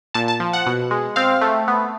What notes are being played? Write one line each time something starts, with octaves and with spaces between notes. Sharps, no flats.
A#2 A5
A5
F3
F#5
B2
G#3
C4 F5
A3
B3